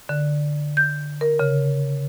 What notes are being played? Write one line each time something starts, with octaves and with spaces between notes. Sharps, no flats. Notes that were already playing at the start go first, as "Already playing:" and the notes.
D3
G6
A#4
C#3